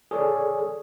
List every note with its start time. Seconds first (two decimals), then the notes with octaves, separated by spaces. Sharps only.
0.11 G#4 A4 C#5 D5